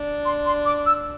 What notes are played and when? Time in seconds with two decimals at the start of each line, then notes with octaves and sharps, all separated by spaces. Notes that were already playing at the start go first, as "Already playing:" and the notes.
Already playing: D4
0.25 C6
0.46 C6
0.66 D6
0.86 E6